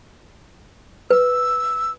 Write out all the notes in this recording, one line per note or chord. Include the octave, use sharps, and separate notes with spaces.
B4 E6